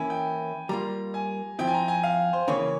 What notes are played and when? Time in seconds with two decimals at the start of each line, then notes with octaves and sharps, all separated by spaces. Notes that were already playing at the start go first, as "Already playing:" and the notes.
Already playing: E3 A#3 C#4 E4 G#5
0.10 G5
0.69 G3 A#3 F4 A#5
1.14 G#5
1.59 F3 C4 E4 G5
1.67 G#5
1.74 A#5
1.88 G#5
2.03 F5
2.33 C5
2.48 C#3 E3 A#3 C#4 C#5